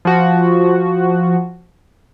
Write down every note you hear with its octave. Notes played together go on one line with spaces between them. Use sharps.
F3 F#4